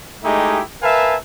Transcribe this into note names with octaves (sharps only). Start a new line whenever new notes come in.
G#3 A3 D#4 E4 G4
A#4 B4 E5 F5 G#5 A5